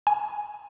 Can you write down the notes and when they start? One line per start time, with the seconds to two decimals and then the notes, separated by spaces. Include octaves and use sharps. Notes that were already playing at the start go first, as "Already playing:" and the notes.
0.07 G#5